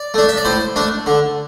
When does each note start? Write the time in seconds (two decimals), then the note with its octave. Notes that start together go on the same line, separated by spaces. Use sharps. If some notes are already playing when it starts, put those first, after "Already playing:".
Already playing: D5
0.14 A3 D4
0.29 E5
0.37 D5
0.45 A2 C5
0.76 A3 D4
1.06 D3